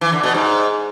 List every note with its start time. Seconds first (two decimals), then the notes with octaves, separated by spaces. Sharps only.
0.01 E3
0.12 D3
0.23 B2
0.35 G#2